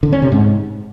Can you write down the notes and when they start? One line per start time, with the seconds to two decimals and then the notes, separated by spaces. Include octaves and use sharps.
0.03 D3
0.13 C#4
0.22 C3
0.32 G#2